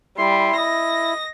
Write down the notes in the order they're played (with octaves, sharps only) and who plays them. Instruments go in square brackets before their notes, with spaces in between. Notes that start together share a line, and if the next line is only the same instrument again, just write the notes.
[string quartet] G3 [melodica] E4 [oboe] C6
[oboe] D#5 [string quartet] A#6